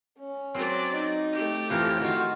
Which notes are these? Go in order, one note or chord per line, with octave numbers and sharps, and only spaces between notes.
C#4
F#3 C4 D5
D#4
A3 G4
F2 E3 F3 A#4
D#3 F4 F#4